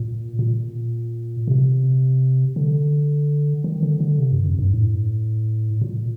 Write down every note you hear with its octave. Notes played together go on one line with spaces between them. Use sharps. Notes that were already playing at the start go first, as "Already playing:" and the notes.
Already playing: A#2
A#2
C3
D3
D#3
D3
D3
C3
G2
F2
G2
A2
A#2